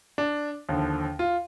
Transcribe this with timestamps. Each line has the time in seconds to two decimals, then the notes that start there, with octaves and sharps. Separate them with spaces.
0.18 D4
0.69 D#2 D3 F3
1.19 F4